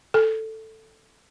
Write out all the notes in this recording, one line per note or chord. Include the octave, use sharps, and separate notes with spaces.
A4